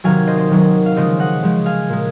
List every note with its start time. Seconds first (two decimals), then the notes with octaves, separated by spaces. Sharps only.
0.04 C3 D#3 F#3 F5 G#5
0.27 C5 D#5
0.38 C5 D#5
0.50 C3 D#3 F#3
0.86 F5
0.96 C#3 F3 G#3 C5 D#5
1.20 D#5 F#5
1.43 C#3 F3 G#3
1.66 F5 G#5
1.89 A#2 G#3